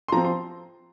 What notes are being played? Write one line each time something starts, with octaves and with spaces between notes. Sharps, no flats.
C6
F3 C4 A#5
C6